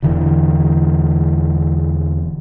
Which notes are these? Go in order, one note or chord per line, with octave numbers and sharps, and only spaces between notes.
E1 D3 E3